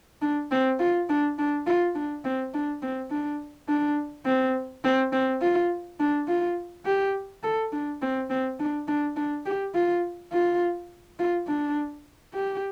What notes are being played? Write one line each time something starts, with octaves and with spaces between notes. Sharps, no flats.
D4
C4
F4
D4
D4
F4
D4
C4
D4
C4
D4
D4
C4
C4
C4
F4
D4
F4
G4
A4
D4
C4
C4
D4
D4
D4
G4
F4
F4
F4
D4
G4